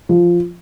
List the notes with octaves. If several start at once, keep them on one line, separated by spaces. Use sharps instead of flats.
F3